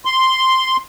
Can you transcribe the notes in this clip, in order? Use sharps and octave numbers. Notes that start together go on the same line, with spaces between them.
C6